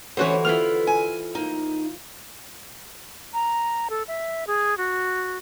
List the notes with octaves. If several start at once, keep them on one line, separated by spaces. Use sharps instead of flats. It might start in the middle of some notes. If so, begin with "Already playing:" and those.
D3 E3 B3 C#4 F#4 C5 C#5
B3 E4 F4 F6
G#5
A#3 D#4
A#5
A4
E5
G#4
F#4